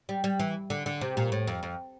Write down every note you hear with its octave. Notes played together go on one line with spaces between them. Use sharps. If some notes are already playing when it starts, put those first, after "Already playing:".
G3
G3
E3
D3
D3
C3
A#2
A2
F2
F2